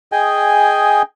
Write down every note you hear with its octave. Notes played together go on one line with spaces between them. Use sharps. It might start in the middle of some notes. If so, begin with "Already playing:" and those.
G#4 D#5 G5 G#5